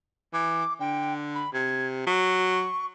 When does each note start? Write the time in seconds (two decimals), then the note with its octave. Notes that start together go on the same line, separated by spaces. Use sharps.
0.33 E3 D6
0.80 D3 G5
1.34 B5
1.53 C3 G#6
2.06 F#3 C#6